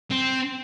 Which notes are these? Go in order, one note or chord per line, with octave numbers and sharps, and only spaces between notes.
C4